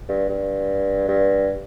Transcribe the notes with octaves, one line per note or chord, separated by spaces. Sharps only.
G2
G2
G2